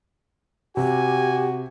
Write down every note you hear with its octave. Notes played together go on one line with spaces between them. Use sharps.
C3 F#4 G4 G#5